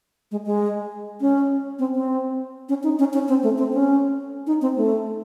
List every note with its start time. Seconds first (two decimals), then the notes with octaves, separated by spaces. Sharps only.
0.31 G#3
0.46 G#3
1.21 C#4
1.79 C4
1.95 C4
2.69 C#4
2.83 D#4
2.99 C#4
3.13 C#4
3.28 C4
3.43 A3
3.58 C4
3.73 C#4
4.47 D#4
4.61 C4
4.76 A3